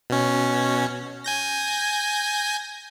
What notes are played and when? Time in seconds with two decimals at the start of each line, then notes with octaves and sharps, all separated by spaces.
0.10 B2 C#4
1.24 G#5 G6 A#6